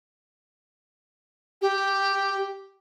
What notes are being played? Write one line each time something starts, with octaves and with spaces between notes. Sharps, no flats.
G4